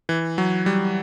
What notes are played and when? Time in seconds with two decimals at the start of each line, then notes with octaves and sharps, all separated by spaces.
0.09 E3
0.38 F#3
0.66 G3